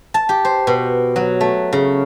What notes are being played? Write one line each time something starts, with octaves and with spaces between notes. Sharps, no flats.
A5
G4
C5
B2
F#3
A3
C#3